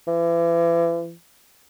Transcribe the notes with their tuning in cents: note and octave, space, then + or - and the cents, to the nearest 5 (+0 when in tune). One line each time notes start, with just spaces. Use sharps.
E3 +40